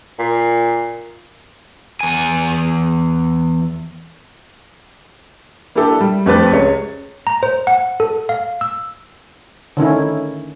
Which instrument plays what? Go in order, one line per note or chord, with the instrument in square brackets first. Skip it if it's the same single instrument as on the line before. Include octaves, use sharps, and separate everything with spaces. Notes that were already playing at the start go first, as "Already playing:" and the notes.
[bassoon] A#2
[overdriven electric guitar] E2 G#5
[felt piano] A#3 D4 E4 G4 A4
G3
F2 A3 G4 B4 C5 A6
C#2 C#5
[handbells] A#5
C5
F#5
A4
F5
E6
[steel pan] D3 D#3 C#4 E4